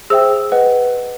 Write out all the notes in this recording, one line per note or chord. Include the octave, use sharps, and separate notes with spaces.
G#4 C5 E5 G5 E6
B4 D#5 F#5